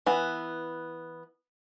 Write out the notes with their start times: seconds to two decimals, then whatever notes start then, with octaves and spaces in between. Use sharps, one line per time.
0.06 E3 B3